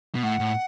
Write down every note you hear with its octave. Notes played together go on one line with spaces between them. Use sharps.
B2
A2 F#5
A2